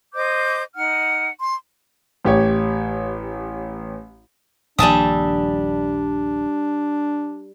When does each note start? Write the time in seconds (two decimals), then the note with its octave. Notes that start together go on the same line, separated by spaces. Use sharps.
0.14 C5 D#5 D6 G6
0.75 D#4 F#5 F6
1.39 C6
2.25 A1 G4 C#5
4.79 D#1 A#1 G3 D4 E5 G#5 A5 D#6